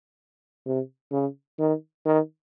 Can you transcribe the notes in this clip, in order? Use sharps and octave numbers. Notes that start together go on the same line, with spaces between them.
C3
C#3
D#3
D#3